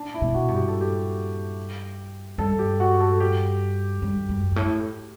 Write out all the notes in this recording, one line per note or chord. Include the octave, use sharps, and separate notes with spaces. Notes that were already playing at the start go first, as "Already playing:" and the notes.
Already playing: D4
E4
B2
F#4
G2
G4
A4
G4
G2 A4
G4
F#4
A4
G4
G2
F#2
G2
A2